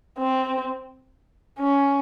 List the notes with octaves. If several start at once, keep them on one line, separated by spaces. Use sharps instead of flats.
C4
C#4